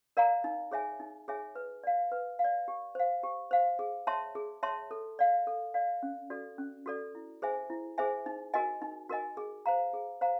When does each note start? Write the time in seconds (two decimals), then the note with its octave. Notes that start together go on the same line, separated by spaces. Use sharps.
0.17 A#4 D5 F5 A#5
0.44 D#4
0.71 G#4 C#5 E5 G#5
1.00 D#4
1.28 G#4 C#5 E5 G#5
1.55 B4
1.84 D5 F5
2.12 B4
2.39 F5
2.44 D5
2.68 G4
2.95 C5 F5
3.23 G4
3.51 C5 F5
3.79 G#4
4.07 C#5 E5 A5 C6
4.35 G#4
4.63 C#5 E5 A5 C6
4.91 A4
5.19 D5 F5
5.47 A4
5.74 D5 F5
6.03 C#4
6.30 F#4 A4 D5
6.58 C#4
6.86 F#4 A4 D5
7.15 E4
7.42 G#4 C5 E5 G#5
7.70 E4
7.98 G#4 C5 E5 G#5
8.26 D#4
8.54 F#4 A#4 D#5 G#5
8.82 D#4
9.09 F#4 A#4 D#5 G#5
9.37 G#4
9.66 C5 F5 A#5
9.93 G#4
10.21 C5 F5 A#5